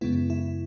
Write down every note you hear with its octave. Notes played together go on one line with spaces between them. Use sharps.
F#2 C#3 G#3 B3 E4
E4